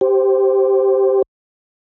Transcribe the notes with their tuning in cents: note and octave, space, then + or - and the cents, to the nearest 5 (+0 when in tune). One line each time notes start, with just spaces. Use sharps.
G4 -5 C5 +0